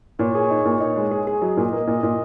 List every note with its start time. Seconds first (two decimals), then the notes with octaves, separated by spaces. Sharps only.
0.19 A#2 C#5
0.35 G#4
0.50 D#4
0.65 A#2
0.80 D#4
0.96 G#3
1.11 G#4
1.27 G#4
1.42 F#3 D#5
1.57 A#2
1.73 A#3
1.87 A#2
2.03 A#2